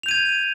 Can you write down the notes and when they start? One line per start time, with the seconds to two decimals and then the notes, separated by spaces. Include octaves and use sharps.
0.03 F7
0.06 G6
0.09 D#7
0.11 G#6